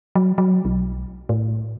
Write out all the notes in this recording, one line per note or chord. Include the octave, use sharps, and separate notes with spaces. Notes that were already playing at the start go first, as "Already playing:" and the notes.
F#3
F#3
B1
A2